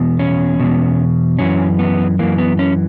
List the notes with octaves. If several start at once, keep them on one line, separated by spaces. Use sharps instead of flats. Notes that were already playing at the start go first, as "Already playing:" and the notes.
Already playing: E2 B2
C#4
E2 B2
F#2 E3 C#4
B3
F#2 E3 A#3
B3
C#4